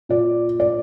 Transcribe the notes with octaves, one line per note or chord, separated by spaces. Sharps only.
A#2 D5
D5